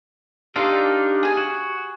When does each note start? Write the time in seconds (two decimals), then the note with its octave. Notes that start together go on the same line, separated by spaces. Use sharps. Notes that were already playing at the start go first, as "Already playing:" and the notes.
0.56 D4 D#4 F4 G4 A4 A#4 F5
1.23 G#4 G#5
1.37 F#4